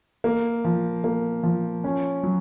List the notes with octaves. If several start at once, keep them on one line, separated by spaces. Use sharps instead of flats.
A#3
F3
A#3
F3
C#4
F#3